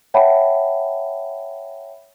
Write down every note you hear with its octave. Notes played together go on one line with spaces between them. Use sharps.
C#5 E5 F#5 G5 A5 B5